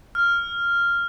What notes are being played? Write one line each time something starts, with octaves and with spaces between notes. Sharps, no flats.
F6